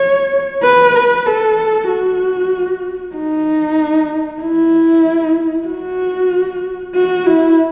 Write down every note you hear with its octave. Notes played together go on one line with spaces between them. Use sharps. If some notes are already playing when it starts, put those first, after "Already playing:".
Already playing: C#5
B4
B4
A4
F#4
D#4
E4
F#4
F#4
E4